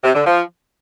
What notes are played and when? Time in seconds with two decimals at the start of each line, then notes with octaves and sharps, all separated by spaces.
0.03 C3
0.14 D3
0.26 F3